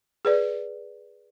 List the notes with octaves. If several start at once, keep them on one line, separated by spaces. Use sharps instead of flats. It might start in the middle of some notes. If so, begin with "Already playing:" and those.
G#4 B4 D5